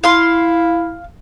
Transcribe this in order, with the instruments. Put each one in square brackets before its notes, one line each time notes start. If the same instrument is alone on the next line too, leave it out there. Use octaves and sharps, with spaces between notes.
[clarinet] E4 [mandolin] F5 C6